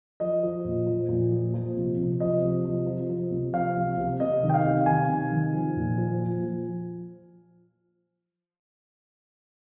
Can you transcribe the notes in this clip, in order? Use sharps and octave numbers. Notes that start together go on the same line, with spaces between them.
F3 D#5
F3
A#2
F3
A#2
F3
F3
C3
C3
F3 D#5
C3
F3
F3
F3
C3
F3 F5
C3
C3
C3 D#5
D#3
G5
F5
C3
D#3 G#5
C3
D#3
F3
A#2
F3
F3
F3